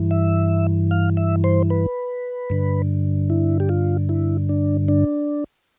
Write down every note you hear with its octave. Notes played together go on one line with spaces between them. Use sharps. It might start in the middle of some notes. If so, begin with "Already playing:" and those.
Already playing: G2 E3
E5
F5
E5
C5
B4
G2 D3
E4
G4
F4
E4
D4
D4